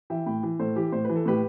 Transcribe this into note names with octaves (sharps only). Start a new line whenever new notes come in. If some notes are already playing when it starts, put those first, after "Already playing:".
E3 E5 G5
A2 G5 B5
E3
A2 A4 C5
E3 G4
A2 C5
E3 B4
A4
A2 G4 B4